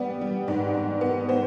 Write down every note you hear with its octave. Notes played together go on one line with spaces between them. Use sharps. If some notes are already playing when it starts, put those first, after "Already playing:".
Already playing: G3 B3 D5
G3
G#2 D5
G#2
B3
B3 C5